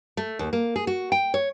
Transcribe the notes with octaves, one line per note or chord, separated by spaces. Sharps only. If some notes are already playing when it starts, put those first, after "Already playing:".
A3
D#2
A#3
G#4
F#4
G5
C#5